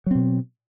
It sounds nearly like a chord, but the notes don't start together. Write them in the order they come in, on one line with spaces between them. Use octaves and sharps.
F#3 C4 B2